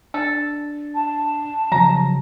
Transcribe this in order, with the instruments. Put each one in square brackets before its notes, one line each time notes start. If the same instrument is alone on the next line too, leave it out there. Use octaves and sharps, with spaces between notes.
[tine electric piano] D4 [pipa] A4
[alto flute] A5
[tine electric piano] C#3 F3 F#3 [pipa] A#5